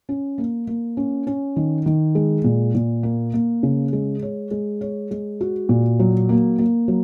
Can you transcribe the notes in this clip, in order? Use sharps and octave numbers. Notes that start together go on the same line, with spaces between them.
C#4
A#3
A#3
C#4
C#4
D#3
D#3
G#3
A#2
A#2
A#3
A#3
C#3
G#3
C#5
G#3
C#5
G#3
F#4
A#2
F#3
A#3
A#3
F#3